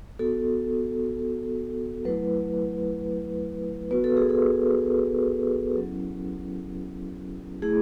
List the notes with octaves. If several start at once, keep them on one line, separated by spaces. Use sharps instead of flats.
B3 F#4 A4
F#3 A3 E4 B4
B3 F#4 B4
A4
G#4
A4
F#3 C#4 E4
A3 E4 G#4